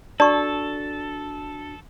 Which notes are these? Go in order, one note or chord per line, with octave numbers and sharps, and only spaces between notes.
D4 F#4 A4 D5 A5 C#6